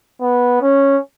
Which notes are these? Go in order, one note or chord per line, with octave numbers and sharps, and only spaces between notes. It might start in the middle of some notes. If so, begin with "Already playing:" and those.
B3
C#4